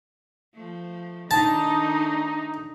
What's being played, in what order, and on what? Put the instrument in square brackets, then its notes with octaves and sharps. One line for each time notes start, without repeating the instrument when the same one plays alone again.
[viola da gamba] F3 A3
[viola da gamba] D#3 A3 D4 [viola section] D#4 [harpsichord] A5